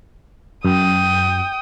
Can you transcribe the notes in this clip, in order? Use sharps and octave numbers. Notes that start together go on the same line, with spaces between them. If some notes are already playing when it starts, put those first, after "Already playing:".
F#2 G5 D#6